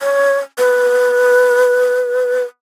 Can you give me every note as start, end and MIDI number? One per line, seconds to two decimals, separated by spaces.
0.01 0.38 73
0.58 2.42 71